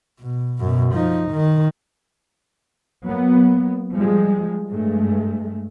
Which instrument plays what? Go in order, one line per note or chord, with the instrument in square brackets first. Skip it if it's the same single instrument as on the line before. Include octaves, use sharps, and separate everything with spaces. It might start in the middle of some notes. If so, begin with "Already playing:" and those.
[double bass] B2
F#2 B2
F3 D#4
D#3
[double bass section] F#3 A#3 B3
F3 G3 G#3
G2 G#3 A3